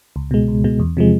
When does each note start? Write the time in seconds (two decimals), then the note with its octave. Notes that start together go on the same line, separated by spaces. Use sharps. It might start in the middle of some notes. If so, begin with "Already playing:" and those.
0.16 C#2
0.31 B2 G#3
0.48 C#2
0.64 B2 G#3
0.79 E2
0.97 C3 F3 G#3